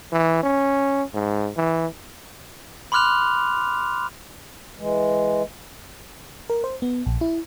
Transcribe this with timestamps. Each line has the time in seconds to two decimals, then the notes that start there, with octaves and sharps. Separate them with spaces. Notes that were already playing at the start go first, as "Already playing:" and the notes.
0.12 E3
0.43 C#4
1.14 G#2
1.57 E3
2.92 B5 C6 D6 F6 F#6 F7
4.78 E3 G#3
6.50 A#4
6.64 C5
6.82 B3
7.06 A#1
7.21 E4